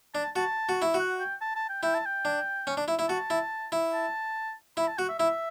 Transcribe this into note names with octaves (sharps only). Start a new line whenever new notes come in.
D4 A5
F#4 A5
F#4
E4
F#4
F#5
G5
A5
A5
G5
E4 G5
A5
G5
D4
C#4
D4
E4
E4
F#4 A5
E4
E4
A5
E4 B5
A5
F#4 F#5
E5
E4 E5